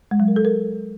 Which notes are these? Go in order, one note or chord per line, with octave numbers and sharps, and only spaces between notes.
G#3
F#3
A#4
A4
A#4